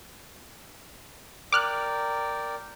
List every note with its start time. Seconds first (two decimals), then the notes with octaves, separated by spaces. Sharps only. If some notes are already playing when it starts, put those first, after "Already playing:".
1.52 A#4 D5 G5 D6 F6 F#6